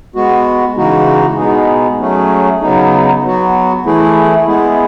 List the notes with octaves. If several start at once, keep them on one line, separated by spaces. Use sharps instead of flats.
G#3 B3 F#4
C#3 E3 G#3 D#4 F#4
B2 G#3 B3 D#4 G#4
F#3 A3 C#4 G#4
C#3 F#3 B3 D#4
F#3 B3 F#4
E3 A3 E4 G#4
G#3 B3 E4 G#4